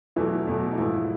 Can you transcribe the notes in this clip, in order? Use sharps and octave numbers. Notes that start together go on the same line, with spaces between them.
E2 B2 E3 F#3 A3 E4
E2 B2 F#3 A3
D#4
G#2 E3 F3 A3 E4